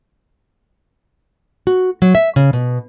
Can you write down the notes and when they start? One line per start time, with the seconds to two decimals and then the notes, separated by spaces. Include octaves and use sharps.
1.67 F#4
2.02 F#3
2.15 E5
2.36 C#3
2.53 B2